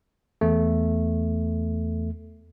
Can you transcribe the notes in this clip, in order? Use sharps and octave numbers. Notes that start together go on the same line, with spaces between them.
E2 A3